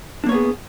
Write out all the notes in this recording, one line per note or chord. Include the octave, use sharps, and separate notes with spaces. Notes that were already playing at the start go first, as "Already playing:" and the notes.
A#3 B3 D4 G#4 C#5